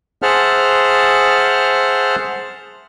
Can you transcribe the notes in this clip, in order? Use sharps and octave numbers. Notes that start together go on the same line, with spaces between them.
G#4 C5 E5 F#5 A5 F6